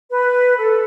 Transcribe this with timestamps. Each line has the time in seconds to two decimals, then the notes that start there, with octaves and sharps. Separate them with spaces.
0.10 B4
0.58 A4